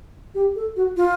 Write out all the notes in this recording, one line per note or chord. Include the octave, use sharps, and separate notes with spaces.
G4
A4
F#4
F4